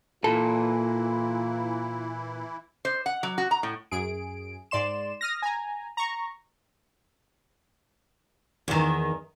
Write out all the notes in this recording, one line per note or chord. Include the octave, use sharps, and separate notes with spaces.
A#2 E3 E4 F4 A4
C5
F#5
F#3
F#4
A#5
A2
F#2 G#4 D7
G#2 D5 C6 E7
D#6 F6 A#6
G#5 A#5
A#5 C#6
E2 D#3